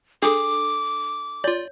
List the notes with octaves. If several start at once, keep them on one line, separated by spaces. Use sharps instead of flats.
D4 G#4 A4 D6
F4 C#5 D5